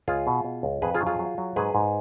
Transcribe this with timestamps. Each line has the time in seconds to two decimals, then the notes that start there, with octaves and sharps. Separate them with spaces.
0.08 C#2 F4 G#4
0.27 B2
0.45 B2
0.63 C#2
0.82 F2 G#4 B4
0.94 F4 G#4
1.01 F#3
1.06 F4 G#4
1.19 F#3
1.38 F#3
1.56 G#2 G#4 B4
1.75 G#2